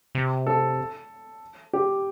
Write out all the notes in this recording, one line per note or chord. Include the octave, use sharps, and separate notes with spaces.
C3
A4
G4